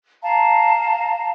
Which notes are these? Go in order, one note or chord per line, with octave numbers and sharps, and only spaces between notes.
F5 A5 A#5